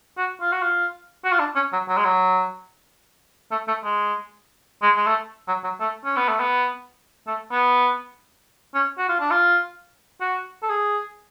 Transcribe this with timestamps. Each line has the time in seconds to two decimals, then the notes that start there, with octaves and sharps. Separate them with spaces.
0.17 F#4
0.41 F4
0.52 F#4
0.62 F4
1.24 F#4
1.32 F4
1.39 D4
1.55 C#4
1.72 F#3
1.88 F#3
1.97 G#3
2.05 F#3
3.51 A3
3.68 A3
3.84 G#3
4.82 G#3
4.96 G#3
5.07 A3
5.47 F#3
5.64 F#3
5.80 A3
6.05 C#4
6.16 B3
6.28 A3
6.40 B3
7.27 A3
7.51 B3
8.74 C#4
8.98 F#4
9.09 F4
9.20 D4
9.31 F4
10.21 F#4
10.62 A4
10.70 G#4